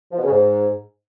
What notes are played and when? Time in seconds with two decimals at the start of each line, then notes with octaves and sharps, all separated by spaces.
0.12 F3
0.18 B2
0.24 C#3
0.31 G#2